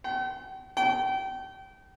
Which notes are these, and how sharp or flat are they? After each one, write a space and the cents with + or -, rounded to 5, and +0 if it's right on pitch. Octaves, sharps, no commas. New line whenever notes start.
G5 -45
G5 -30